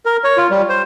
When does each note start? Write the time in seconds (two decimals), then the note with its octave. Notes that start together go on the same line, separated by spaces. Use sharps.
0.06 A#4
0.24 C#5
0.37 F4
0.51 G3
0.69 C5